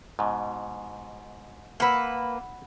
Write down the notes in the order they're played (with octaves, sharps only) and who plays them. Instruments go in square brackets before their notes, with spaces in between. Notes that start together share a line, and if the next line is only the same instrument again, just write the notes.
[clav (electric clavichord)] G#2 B2
[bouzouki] A#3 B4 [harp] F#5 B5 E6